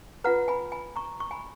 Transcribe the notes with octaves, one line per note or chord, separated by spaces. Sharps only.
F4 B4 F#5 A#5
G#5 B5
G#5 B5
A#5 C#6
C#6
G#5 B5